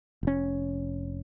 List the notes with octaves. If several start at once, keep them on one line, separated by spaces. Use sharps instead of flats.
F1 C#4